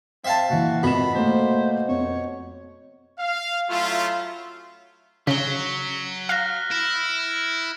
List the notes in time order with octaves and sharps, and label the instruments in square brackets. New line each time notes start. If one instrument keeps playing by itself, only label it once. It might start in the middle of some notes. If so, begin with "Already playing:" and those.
[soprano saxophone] C4 [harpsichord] E5 F5 A5
[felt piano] A#2 E3 [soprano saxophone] F#4
[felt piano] G#1 F4 E7 [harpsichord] B2 [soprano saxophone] B5
[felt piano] A3 A#3 [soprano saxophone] C5
[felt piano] F2 [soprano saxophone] C#5
[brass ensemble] F5
F#3 A3 C#4 E4 F4
[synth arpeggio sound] C#3 [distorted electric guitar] F#3 [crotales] B6 G7
[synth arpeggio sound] F5 [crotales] F6 F#6 A#6
[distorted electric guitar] E4